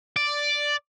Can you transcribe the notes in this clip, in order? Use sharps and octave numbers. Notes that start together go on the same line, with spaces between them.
D5